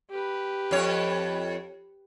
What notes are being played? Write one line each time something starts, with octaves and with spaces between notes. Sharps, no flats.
G4 B4
F2 C#5